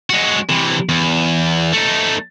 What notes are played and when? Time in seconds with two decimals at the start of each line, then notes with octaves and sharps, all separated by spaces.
0.10 G#3 F#4
0.50 C3 E3
0.89 E2
1.72 A3 D#4